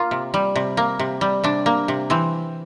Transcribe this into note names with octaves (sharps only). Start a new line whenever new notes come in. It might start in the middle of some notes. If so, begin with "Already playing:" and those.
Already playing: A#3 F4
C3
G3
C3
A#3
C3
G3
C3 D4
A#3
C3
E3 C4